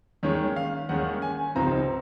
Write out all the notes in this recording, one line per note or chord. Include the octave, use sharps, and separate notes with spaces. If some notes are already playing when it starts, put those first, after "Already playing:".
D#2 D#3 G#3 C#4 C#5
F5
D#2 D#3 G#3 C#4 F#5
G#5
C#2 C3 F3 C4 D#4 A#5